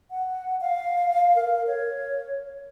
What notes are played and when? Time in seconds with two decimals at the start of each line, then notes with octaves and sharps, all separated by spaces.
0.11 F#5
0.61 F5
1.36 A#4
1.67 C#5